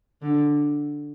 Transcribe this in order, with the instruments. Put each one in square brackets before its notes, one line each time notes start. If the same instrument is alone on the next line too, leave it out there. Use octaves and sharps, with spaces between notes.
[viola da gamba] D3